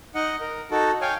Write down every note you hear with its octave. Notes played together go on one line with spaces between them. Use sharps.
D#4 D#5 F#5
A#4
D#4 F#4 A4
C#5 F5 G5 G#5